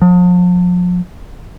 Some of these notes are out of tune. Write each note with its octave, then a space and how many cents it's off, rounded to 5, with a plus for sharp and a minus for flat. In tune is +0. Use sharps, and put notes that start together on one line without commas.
F3 +40